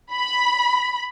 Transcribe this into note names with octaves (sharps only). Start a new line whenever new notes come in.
B5